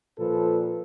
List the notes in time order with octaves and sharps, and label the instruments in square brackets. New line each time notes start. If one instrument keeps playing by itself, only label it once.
[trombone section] A#2 F3 A4 B4